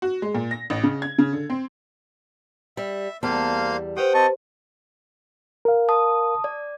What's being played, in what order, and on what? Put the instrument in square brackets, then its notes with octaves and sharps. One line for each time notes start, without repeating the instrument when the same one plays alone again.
[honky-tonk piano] F#4
G#3
A#2
A#6
A1
C#3
G#6
C#3
D3
C4
[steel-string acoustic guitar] G3 [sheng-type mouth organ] E5
[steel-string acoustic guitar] E2 G3 A5 [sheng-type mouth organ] A#3 C5 F5
[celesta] G4 B4 C5 [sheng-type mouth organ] F#5 G5 D#6
[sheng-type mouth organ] C4 D#5 C#6 [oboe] A5
[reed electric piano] A#4 F5
[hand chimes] A5 D#6
D5